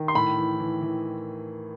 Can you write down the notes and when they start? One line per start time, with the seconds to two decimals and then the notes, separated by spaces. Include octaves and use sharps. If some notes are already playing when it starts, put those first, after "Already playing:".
Already playing: D#3
0.08 C6
0.15 A2 B5
0.37 E3
0.59 E3
0.81 E3